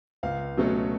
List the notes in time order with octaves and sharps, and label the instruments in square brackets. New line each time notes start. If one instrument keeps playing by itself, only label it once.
[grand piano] C#2 F5
B2 F#3 A3 C#4